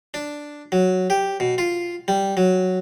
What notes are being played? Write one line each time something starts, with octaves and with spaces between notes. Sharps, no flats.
D4
F#3
G4
B2
F4
G3
F#3